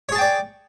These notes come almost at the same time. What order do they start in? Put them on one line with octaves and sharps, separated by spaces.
C#5 G#4 A5 G5 D5